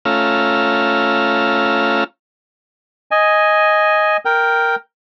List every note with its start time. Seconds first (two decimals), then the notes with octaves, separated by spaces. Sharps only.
0.05 A3 C#4 F4 A#5 E6 F6
3.11 D#5 G#5
4.25 A#4 G5